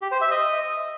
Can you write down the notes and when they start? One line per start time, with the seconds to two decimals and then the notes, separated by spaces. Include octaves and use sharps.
0.02 G4
0.11 C5
0.21 E5
0.31 D#5